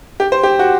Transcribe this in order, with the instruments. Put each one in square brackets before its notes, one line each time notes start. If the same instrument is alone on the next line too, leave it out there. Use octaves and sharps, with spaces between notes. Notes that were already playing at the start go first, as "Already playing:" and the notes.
[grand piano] G4
C5
G4
F#4